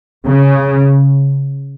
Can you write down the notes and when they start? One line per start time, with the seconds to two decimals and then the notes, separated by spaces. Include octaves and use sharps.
0.24 C#3